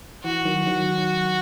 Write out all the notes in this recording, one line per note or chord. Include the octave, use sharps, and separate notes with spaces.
E3 F#4
D#3 F#3
D#3 F#3